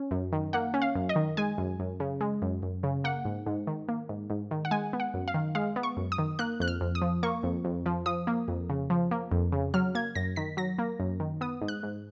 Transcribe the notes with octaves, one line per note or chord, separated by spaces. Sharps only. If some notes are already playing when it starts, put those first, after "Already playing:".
Already playing: C#4
F#2
D#3
A#3 F#5
C#4
F5
F#2
D#5
D#3
G#3 G#5
F#2
F#2
C#3
G#3
F#2
F#2
C#3
A#3 F#5
G#2
G#2
D#3
A#3
G#2
G#2
D#3
F#5
G#3 G#5
B3
F#5
F#2
F5
D#3
G#3 F5
B3
C#6
F#2
D#6
D#3
A#3 F#6
F2 F#6
F6
F2
D#6
F3
A#3 C#6
F2
F2
F3
F3 D#6
A#3
F2
C#3
F3
A#3
F2
C#3
F#3 F6
A#3 G#6
F#2 A#6
D#3 B6
F#3 A#6
A#3
F#2
D#3
B3 D#6
G#2
F#6
G#2